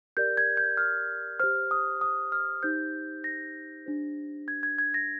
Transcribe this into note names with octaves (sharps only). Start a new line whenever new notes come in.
G4 A#4 D5 G6
G#6
G6
F6
G4 C5 F6
D#6
D#6
F6
D#4 G4 C5 G6
A#6
D4 G4 C5
G#6
G#6
G#6
A#6